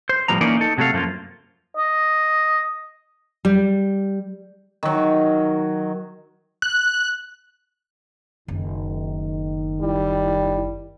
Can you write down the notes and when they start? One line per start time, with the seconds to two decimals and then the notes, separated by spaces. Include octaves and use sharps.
0.09 C5
0.28 A2 F3 G3 B3 A#5
0.41 E3 A#3 C#4 D#4 D5
0.57 D#4 A4
0.78 C3 F#3 A3 A4 F5
0.93 F#2 F3 A#3 F4
1.77 D#5
3.45 G3
4.83 D#3 F#3
6.62 F#6
8.48 F#1 D#3
9.81 G3 E4